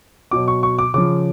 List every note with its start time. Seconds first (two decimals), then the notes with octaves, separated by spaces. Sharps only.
0.31 B2 F#3 D6
0.48 C#6
0.63 C#6
0.79 D6
0.94 C#3 F3 D6